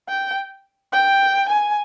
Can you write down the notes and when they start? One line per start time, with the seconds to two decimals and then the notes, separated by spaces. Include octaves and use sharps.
0.08 G5
0.93 G5
1.49 G#5